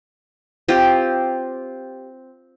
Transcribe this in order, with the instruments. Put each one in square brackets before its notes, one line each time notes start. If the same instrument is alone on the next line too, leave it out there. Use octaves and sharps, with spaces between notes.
[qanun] C4 F4 G4